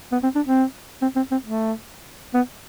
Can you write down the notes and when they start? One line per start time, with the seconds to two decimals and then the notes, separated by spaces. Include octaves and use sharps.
0.12 B3
0.23 C4
0.35 D4
0.46 C4
1.02 C4
1.16 C4
1.31 C4
1.46 A3
2.34 B3